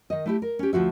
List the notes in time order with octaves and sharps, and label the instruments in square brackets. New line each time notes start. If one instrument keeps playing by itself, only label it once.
[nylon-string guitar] D#3 D#5
A3 E4 G4
A#4
C#4 G4
D2 F3 F#4 E5